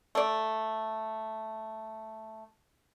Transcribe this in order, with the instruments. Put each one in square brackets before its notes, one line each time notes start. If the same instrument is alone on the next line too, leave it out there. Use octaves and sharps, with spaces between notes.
[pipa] A3 D5